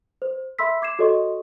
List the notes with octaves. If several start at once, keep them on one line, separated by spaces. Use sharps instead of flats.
C5
E5 B5 C6 E6 B6
D6 G#6 C7 E7
F#4 A4 C#5 D#5 C6 C#6